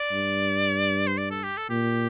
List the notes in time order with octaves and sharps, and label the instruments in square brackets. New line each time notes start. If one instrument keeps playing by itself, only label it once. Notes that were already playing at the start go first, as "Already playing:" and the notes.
Already playing: [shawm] D5
[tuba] G2
[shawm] C5
D5
A4
G4
A4
[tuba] A#2 [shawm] G4